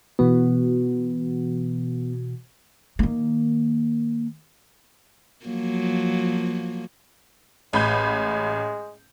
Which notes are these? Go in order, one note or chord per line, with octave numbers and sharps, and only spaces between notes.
B2 E3 B3 F#4
D#3 A#3
F3 F#3 A#3
A1 G#3 B5 G6